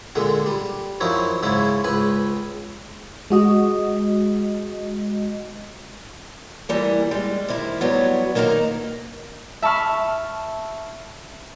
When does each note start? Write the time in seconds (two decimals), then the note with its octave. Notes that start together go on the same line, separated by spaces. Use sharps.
0.15 A#2 D3 G#3
0.46 G3
1.01 F#2 F3 F#3 D#4 E4
1.43 G#2 C#3 G#3 E4
1.84 C#2 B4 G#5
3.30 G#3 F#4 D#5
6.69 E3 G3 A#3
7.11 G3 G#3
7.48 C3 D#3 E4
7.81 F#3 G3 B3
8.35 D#3 A#3 D#4 A4 A#4
9.62 E5 A5 B5 C#6 F6